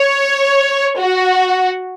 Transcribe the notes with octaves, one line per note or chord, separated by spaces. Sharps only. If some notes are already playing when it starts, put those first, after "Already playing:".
Already playing: C#5
F#4